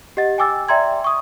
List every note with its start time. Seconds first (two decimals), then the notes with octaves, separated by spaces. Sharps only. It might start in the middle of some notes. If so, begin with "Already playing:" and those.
0.17 G4 D#5 F#5 A6
0.38 G5 G#5 D6 E6 A6
0.68 D5 E5 G5 A#5 C6 G#6
1.04 C#6 D#6